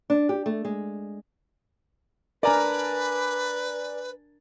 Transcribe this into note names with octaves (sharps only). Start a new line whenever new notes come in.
D4
G4
A3
G#3
D4 A#4 B4 D5 G#5 A#5